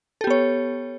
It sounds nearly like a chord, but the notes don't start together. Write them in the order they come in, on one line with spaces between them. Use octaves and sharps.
A4 G4 B3 C#5